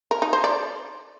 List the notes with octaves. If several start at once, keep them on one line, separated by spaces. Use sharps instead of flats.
A#4
D#4
C5
D5